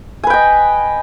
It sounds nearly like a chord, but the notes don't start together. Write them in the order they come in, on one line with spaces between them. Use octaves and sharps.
G#5 B4 G5 D#5